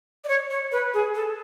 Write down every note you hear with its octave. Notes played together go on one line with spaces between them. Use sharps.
D5
C#5
C#5
B4
G#4
A4